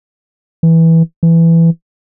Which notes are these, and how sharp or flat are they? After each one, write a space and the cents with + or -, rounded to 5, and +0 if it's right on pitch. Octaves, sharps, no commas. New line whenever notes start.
E3 -10
E3 +10